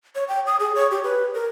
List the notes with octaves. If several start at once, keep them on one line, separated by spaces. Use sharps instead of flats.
C#5
G5
D#6
G#4
C#5
G4
B4
A#4